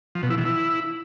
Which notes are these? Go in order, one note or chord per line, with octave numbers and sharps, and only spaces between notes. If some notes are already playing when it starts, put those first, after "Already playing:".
F3
B2
E4
E3
E4